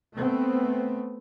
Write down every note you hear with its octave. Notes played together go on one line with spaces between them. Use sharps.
A3 B3 C4